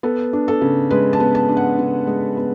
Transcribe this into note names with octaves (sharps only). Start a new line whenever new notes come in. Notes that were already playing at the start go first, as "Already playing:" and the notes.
B3 A4
D4
A4
C#3
G#3 B4
A5
B3
A5
D4
F#5
C#3
G#3
B3